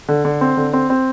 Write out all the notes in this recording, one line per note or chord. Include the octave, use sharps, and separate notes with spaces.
D3
D3
C4
D3
C4
C4